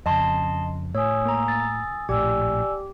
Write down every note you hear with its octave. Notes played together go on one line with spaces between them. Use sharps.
F2 C#3 D#5 A5 C6
A2 C#5 G#5 D#6 E6
A#3 A#5
A6
A#1 A2 G4 D5 G#5 E6